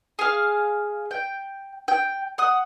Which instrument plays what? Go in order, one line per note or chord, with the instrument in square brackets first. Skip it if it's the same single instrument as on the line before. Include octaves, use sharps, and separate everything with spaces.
[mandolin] G#4 F5
G5
G5
F#5 D#6